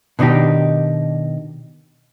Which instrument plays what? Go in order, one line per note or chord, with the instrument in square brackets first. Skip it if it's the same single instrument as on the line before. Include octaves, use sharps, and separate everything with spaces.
[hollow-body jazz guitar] B2 D#3 D4 D#4 G4